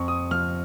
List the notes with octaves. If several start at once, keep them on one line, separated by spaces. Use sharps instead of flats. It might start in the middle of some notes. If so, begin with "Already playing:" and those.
Already playing: F2 C#6
D#6
F3 F6